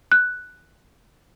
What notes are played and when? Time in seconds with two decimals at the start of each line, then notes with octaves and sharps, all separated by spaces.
0.12 F#6